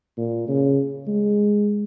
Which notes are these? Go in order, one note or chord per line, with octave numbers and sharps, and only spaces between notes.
A#2
C#3
G#3